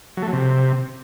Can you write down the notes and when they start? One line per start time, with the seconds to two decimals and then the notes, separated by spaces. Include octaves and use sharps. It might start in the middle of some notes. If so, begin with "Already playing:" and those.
0.17 F#3
0.22 A3
0.28 F#3
0.33 C3